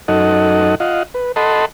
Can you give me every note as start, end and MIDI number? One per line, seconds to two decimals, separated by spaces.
0.08 0.75 42
0.08 0.75 63
0.08 0.75 69
0.08 0.75 75
0.08 0.75 78
0.80 1.03 65
0.80 1.03 75
0.80 1.03 77
0.80 1.03 78
1.14 1.32 71
1.36 1.65 69
1.36 1.65 75
1.36 1.65 78
1.36 1.65 81
1.36 1.65 83
1.36 1.65 84